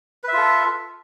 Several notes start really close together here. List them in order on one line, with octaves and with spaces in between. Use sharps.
B4 E5 F4 A4